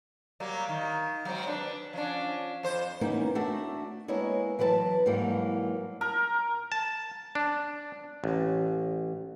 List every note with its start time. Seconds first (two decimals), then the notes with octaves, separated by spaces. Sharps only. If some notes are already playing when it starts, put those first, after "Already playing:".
0.40 F#3 G3 A#3
0.69 D#3
1.25 F#3 G#3 C4
1.47 D4 B4
1.93 F3 C#4 D4
2.63 F2 C5
3.01 E3 A#3 B3 C#4 D#4
3.35 A3 D4 F#4 E5 F#5
4.08 G#3 A#3 B3 E4 C#5 D#5
4.59 E3 F#3 B4 F#5 A5
5.06 G#2 E3 F#3 G3 A#3
6.01 A#4
6.72 A5
7.35 D4
8.24 A1